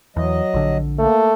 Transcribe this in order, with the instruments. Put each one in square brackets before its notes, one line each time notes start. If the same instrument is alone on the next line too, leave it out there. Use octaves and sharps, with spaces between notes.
[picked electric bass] E2 [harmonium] F#3 D#5
[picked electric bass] A#1 D3
[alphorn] A3 [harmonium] A#3